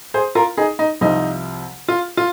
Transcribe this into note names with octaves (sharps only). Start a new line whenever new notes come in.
G#4 C5
F4 A#4
D#4 G#4
D#4
C2 C3 F3 D#4
F4
F4